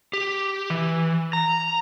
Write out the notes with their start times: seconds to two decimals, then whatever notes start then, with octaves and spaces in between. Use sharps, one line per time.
0.13 G4
0.70 E3
1.33 A#5